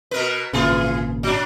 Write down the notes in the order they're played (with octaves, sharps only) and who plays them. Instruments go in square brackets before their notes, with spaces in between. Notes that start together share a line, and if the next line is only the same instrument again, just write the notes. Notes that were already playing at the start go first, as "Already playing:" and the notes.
[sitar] B2 A#4 B4
[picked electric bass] G#1 A#2 C#3 [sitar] E3 F4 G#4
[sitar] F#3 D4